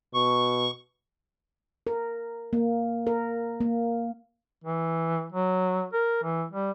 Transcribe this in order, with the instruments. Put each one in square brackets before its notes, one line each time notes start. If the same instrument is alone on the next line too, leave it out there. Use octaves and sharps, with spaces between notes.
[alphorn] B2 [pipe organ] C#6
[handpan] A#4
A#3
A#4
A#3
[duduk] E3
F#3
A#4
E3
G3